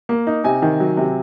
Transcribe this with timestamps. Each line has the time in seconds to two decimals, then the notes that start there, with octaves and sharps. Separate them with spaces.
0.09 A#3
0.27 D#4
0.44 C3 G#5
0.62 D#3
0.80 F#3
0.97 C3